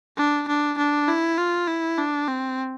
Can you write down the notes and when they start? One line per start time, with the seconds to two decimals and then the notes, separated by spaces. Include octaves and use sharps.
0.17 D4
0.48 D4
0.78 D4
1.08 E4
1.38 F4
1.68 E4
1.98 D4
2.28 C4